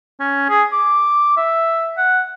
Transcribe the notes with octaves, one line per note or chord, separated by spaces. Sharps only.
C#4
G#4
D6
E5
F#5